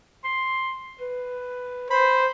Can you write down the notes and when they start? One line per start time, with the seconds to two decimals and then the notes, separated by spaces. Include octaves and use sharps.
0.24 C6
1.01 B4
1.90 C5 B5